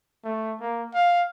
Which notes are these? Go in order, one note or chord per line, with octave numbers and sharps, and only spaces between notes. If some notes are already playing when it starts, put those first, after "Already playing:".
A3
A#3
F5